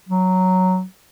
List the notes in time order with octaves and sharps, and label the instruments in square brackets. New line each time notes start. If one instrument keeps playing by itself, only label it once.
[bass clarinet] F#3